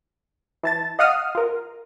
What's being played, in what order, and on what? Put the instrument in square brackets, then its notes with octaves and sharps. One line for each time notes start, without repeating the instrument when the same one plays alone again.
[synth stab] E3 A5 A6
D#5 F5 F#5 D#6 F6
F4 A#4